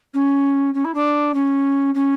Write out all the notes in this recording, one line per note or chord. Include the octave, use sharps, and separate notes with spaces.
C#4
C#4
E4
D4
C#4
C#4